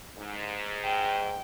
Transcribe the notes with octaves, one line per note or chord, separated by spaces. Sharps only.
G#2
G5